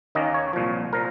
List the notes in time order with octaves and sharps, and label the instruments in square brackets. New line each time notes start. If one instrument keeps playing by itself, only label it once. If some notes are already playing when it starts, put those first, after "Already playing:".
[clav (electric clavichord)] D#2 D#3 A#3 C#4 D#5
C#5
C2 A#2 F3
A#2 F3 A#4